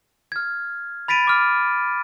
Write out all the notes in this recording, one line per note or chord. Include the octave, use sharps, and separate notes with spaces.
F6 G#6
B5 A6 B6 D7 D#7
D6 F6